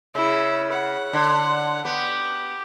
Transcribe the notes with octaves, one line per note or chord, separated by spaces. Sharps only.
C#3 E4
F#5
D3
B3 G4